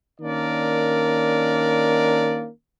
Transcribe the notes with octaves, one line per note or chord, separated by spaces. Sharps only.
D#3 A#3 C#4 D4 A#4 D5